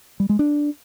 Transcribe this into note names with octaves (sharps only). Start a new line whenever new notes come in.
G3
G#3
D4